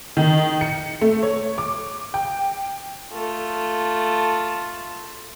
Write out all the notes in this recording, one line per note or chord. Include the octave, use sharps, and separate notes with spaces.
D#3
C#7
A3
C#5
D6
G5
A3 F4